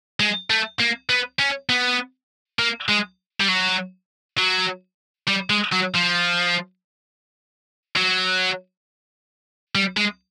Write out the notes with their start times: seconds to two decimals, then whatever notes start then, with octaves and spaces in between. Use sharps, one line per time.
0.20 G#3
0.50 A3
0.80 A#3
1.10 B3
1.39 C#4
1.69 B3
2.59 A#3
2.89 G#3
3.40 G3
3.48 F#3
4.38 F#3
5.28 G3
5.50 G#3
5.72 F#3
5.94 F3
7.96 F#3
9.75 G3
9.97 G#3